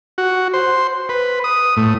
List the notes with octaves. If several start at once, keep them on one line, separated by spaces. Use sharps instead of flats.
F#4
C5
B4
D#6
A2